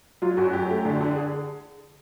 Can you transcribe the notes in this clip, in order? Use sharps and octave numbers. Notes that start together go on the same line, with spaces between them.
F#3 F4
F#2 F#4
F#2 G4
A3
D3
D3
G#4